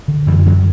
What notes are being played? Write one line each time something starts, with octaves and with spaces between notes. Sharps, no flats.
D3
F#2 E3 G3
F#2 D3 F#3